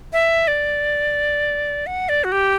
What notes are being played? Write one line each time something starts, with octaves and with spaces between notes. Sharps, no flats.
E5
D5
F#5
D5
F#4
G4